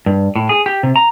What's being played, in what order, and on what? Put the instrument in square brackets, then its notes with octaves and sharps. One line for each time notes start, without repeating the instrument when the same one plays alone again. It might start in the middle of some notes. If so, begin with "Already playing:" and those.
[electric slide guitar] G2
A2
G#4
G4
C3
A#5